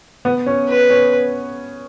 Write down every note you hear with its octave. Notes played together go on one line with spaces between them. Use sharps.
B3
C#4
B4
C#4